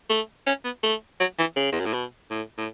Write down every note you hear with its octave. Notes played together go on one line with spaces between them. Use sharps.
A3
C#4
B3
A3
F#3
E3
C#3
E2
F#2
A2
B2
A2
A2